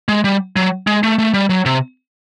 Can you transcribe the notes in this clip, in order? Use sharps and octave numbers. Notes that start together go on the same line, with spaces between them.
G#3
G3
F#3
G#3
A3
A3
G3
F#3
C3